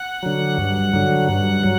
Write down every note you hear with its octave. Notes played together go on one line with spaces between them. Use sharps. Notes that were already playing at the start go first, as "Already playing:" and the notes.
Already playing: F#5
D3 F#3
G2
D3 F#3
G2
F#3